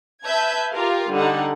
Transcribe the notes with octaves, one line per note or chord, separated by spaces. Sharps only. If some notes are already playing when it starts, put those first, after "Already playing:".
B4 E5 A5 G6 G#6
F4 G4 A#4 F5
D3 G3 D#4 F#5